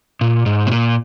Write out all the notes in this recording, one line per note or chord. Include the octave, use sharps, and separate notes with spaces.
A#2
G#2
B2
A#2